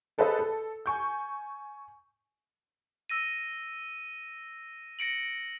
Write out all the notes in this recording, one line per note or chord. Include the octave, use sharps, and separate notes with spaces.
G#4 A4 B4 C5 D#5
A4
G#5 C#6 G6
E6 A#6 D#7
A#6 C#7 D7 F#7